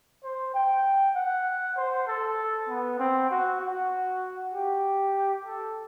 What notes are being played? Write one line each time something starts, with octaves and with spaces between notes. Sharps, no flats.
C5
G5
F#5
C5
A4
B3
C4
F#4
F#4
G4
A4